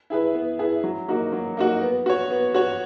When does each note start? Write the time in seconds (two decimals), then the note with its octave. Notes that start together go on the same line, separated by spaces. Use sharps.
0.10 E4 G#4 B4
0.35 B3
0.59 E4 G#4 B4
0.84 F#3
1.08 A#3 D#4 F#4
1.32 F#3
1.57 A#3 D#4 F#4
1.81 B3
2.06 F#4 C#5
2.31 B3
2.55 F#4 C#5